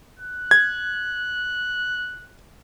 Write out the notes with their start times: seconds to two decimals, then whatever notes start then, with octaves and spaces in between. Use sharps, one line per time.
0.19 F#6
0.51 G#6